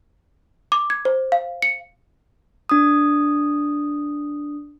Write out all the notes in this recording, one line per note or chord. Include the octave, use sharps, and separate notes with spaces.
D6
G#6
C5
F5
C#7
D4 D#6